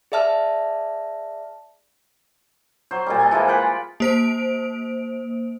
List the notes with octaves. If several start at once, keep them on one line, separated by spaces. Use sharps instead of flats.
G#4 D5 E5 A5 F6
F#3 C5
A#2 D#3 G3
A4 D#5 G#5
E3 F3 G#3 A#3
F4 F#5 G5 B5
A#3 C5 D7